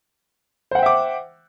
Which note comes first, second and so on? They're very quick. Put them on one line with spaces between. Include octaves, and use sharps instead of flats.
C5 F#5 G5 E5 D6